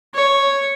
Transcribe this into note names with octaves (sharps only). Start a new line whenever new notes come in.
C#5